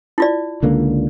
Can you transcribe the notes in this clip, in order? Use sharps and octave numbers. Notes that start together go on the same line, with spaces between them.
E4 F4 D5
C#2 D3 A#3